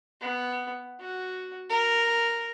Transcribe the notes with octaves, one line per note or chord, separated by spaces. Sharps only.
B3
F#4
A#4